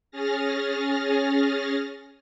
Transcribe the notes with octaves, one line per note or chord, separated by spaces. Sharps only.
C#4 G#4 F6 A6 A#6